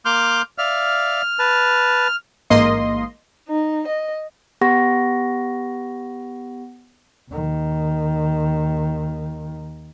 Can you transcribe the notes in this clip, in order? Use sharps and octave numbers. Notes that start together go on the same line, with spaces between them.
A#3 C6 D6 F6 G6
D5 E5 F5 F6
B4 A5
A1 G#2 A#3 D#5 C6
D#4
D#5
B3 G4 F#5 B5 C#6 A#6
D#2 D#3